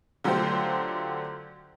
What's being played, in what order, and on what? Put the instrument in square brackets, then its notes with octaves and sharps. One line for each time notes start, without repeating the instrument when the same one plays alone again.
[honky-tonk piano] D3 F#3 A3 F4 G4 C5